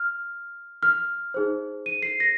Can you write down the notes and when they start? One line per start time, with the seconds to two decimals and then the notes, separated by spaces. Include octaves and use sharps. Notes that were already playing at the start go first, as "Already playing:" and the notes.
Already playing: F6
0.83 F6
1.34 D#4 G#4 C5
1.86 D#7
2.02 C7
2.20 A#6